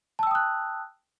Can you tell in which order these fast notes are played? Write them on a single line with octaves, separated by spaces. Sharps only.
A5 E6 G5 D#6 F#6